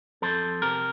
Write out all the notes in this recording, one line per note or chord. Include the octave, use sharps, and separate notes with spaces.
F2 A4 C5
C3 G4 A#4